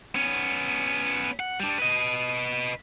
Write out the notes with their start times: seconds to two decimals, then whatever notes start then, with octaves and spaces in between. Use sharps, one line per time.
0.15 B3 C#4
1.40 F#5
1.60 G3 D4
1.78 B4 D#5